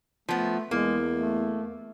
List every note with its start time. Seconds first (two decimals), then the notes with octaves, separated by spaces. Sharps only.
0.29 F3 A3 B3
0.71 E2 G#3 A#3
1.14 A3